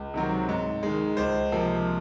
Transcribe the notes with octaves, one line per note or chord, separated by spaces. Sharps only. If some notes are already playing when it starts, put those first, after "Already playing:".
Already playing: C#2
C3 D#3 F#3 C4
G#2
D#3 G#3
C#2 C5
C3 F3 A#3